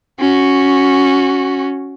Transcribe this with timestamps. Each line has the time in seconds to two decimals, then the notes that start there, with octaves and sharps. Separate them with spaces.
0.20 C#4 F#4